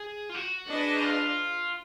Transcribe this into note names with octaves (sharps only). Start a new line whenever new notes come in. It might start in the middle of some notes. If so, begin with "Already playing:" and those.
Already playing: G#4
F4
F#4
D4 G#4 B4 D#5
D#4
F4